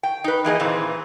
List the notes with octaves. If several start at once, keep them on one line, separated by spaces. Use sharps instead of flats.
G5
D#4 B4
E3 A#3 G#4 D#5
A#2 E3 C4